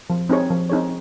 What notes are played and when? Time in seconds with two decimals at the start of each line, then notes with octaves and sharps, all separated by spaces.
0.10 F3
0.29 C4 D#4 G#4 C#5
0.50 F3
0.70 C4 D#4 G#4 C#5